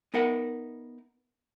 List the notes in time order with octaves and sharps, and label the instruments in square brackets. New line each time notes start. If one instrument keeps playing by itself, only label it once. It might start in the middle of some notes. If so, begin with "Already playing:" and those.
[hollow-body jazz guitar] B3 D#4 A#4 E5 F#5